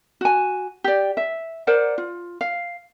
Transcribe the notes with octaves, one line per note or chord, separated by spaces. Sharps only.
F#4 G#5
G4 D5
E5
A#4 C5 D5 F#5
F4
F5